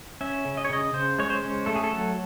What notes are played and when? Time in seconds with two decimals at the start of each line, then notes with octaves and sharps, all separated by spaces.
0.21 C#4 E5
0.45 C#3
0.57 D#5
0.65 C#5
0.70 C#3 D#5
0.93 C#3 C5
1.18 G#3 C#5
1.30 C5
1.42 C#4
1.66 A3 A4
1.75 G#4
1.84 A4
1.92 F#3